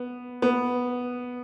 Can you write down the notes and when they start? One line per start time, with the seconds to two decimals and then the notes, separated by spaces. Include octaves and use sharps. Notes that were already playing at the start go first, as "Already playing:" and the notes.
Already playing: B3
0.42 B3